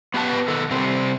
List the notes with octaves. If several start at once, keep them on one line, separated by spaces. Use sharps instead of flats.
B3 G4 B4 A5
D#3 A4
C3 G3 C4